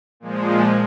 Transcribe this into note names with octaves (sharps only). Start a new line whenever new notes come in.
A#2 F3 G#3